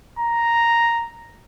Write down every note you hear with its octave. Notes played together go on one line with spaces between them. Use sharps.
A#5